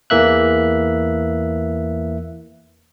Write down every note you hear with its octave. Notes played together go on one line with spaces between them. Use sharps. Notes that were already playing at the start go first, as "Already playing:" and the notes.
E2 E3 A#3 E5 F#6